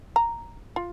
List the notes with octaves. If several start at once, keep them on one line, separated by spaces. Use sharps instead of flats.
A#5
F4